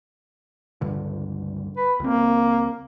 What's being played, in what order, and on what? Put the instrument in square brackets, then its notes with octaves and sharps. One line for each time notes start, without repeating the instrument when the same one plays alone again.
[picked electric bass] C#2 G2 D3
[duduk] B4
[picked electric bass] C#2 C4 [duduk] A#3